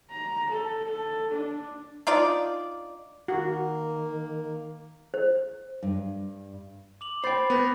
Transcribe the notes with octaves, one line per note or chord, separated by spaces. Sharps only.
A#5
A4
A4
D4
D4 D#4 F4 D5
D#3 A#3 F#4
C5
G2
D6 F7 F#7
C5 G5 B5 A6 C7
B3 G6 A#6 F7